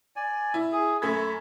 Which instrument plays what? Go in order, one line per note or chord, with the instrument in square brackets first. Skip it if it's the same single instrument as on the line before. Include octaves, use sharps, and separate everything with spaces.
[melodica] D5 G#5
[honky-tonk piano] E4
[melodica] G#4
[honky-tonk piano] F#2 A3 G#6 [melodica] B5